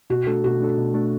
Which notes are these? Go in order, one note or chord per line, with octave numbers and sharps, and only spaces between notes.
B2 F#4
A3 D4 A4
B2 F#4
A3 D4 A4
B2
A3 D4 A4